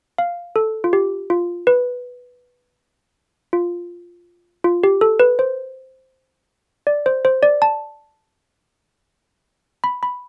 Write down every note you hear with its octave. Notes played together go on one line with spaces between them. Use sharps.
F5
A4
F4
G4
F4
B4
F4
F4
G4
A4
B4
C5
D5
C5
C5
D5
A5
B5
B5